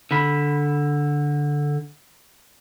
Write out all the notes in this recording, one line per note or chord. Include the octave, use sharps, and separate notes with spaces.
D3 B5